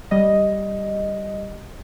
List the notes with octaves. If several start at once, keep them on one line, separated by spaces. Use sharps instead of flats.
G3 D#5